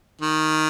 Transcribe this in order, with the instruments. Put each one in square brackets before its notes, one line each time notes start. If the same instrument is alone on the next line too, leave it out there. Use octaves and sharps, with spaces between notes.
[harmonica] D#3